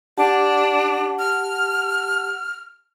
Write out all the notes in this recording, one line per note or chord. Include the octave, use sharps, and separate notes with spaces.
D4 G4 F#5 A5
F6